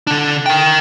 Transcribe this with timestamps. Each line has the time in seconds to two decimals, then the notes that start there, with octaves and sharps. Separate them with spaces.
0.07 D3 D4
0.46 A#4 G5